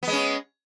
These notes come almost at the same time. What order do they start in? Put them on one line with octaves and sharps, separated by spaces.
B3 G#3 C#4